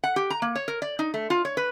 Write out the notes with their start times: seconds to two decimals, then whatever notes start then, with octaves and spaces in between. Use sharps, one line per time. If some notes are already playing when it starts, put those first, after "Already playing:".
0.04 F#5
0.16 G4
0.30 A#5
0.42 A#3
0.56 C#5
0.68 A#4
0.82 D5
0.99 D#4
1.14 A3
1.30 F4
1.45 C#5
1.57 B4